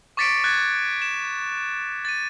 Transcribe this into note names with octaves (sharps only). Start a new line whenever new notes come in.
C#6 D6 A6 B6 C#7 D7
F#6 G#6 A6
E7
A6 D#7